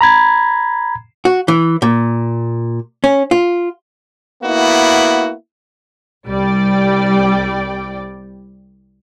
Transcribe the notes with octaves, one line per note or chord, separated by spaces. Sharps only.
A#5 B5 G#6
F#4
E3
A#2
C#4
F4
A#3 B3 E4 F#4
C2 G3 D5 G5